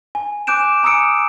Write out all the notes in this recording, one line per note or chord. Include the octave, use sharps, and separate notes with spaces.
G#5
G#5 D6 F#6 G6 D7 E7
G#5 A#5 D#6 E6 C#7 D7